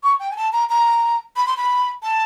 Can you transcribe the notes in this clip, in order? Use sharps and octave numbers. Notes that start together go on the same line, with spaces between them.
C#6
G5
G#5
A5
A#5
A#5
B5
C6
B5
A5